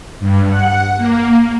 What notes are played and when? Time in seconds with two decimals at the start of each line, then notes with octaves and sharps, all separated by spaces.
0.20 G2
0.50 F#5
0.97 A#3